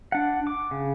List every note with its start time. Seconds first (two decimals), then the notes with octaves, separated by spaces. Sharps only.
0.12 D4 F#5
0.47 D6
0.71 C#3